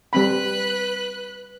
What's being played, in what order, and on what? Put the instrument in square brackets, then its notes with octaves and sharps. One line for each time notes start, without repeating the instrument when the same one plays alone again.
[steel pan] G3 C4 B5 [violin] B4 F#6